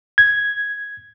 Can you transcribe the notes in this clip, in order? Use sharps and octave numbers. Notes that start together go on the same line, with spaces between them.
G#6